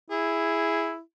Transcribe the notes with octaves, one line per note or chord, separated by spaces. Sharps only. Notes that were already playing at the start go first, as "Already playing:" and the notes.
E4 G#4